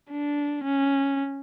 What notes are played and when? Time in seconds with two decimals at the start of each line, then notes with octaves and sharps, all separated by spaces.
0.11 D4
0.64 C#4